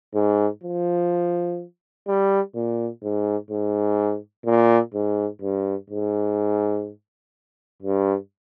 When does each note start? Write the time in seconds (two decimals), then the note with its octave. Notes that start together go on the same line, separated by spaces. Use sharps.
0.14 G#2
0.64 F3
2.07 G3
2.55 A#2
3.03 G#2
3.51 G#2
4.46 A#2
4.94 G#2
5.42 G2
5.90 G#2
7.82 G2